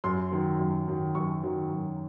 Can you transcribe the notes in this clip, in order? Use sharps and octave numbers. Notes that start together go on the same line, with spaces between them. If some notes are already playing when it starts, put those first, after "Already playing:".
F#2 C6
D#3 F#3
F#2
D#3 F#3
F#2 C#6
D#3 F#3
F#2